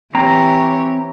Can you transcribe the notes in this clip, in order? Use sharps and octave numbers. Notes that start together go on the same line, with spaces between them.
E3 C4 G4 C#5 A#5